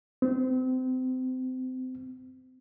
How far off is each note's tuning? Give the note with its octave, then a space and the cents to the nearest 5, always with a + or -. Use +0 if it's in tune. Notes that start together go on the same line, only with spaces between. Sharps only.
C4 -30